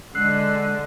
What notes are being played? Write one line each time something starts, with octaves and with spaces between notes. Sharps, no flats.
D3 G#3 E6 F#6 C7